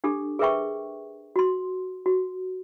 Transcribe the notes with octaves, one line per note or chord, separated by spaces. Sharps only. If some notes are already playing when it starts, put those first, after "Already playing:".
D4 G4 A4 D6
G#4 A#4 B4 E5 G5 C#6
F#4 C6
F#4